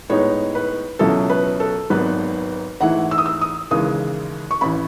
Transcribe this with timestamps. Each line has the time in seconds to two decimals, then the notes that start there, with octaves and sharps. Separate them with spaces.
0.10 A2 G#3 B3 D#4 C#5
0.55 B4
0.99 C#2 B2 F#3 C#4 E4 A4
1.30 B4
1.60 A4
1.90 G#1 G#2 F#3 B3 B4
2.80 G#2 E3 A3 E4 F#5
3.11 E6
3.18 D#6
3.26 E6
3.41 D#6
3.71 D#2 C#3 E3 G#3 D#6
4.51 C#6
4.61 A1 E3 B5